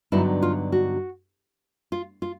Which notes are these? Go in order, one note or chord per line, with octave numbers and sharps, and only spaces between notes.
G2 D3 F#3 B3 D#4 E4
F4
F#4
F4
F4